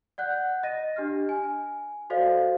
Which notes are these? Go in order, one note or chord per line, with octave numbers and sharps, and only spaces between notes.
D5 F#5 F#6 G6
D#5 A#6 D#7
D4 G4 D#5 F6
G#5
F#4 A4 C5 D5 D#5 F5